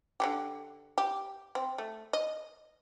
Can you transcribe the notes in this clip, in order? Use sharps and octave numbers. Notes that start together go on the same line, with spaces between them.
D3 E3 G4
G4
C4
A3
D#5